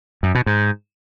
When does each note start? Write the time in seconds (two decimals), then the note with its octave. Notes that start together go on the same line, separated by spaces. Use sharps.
0.23 F#2
0.35 B2
0.46 G#2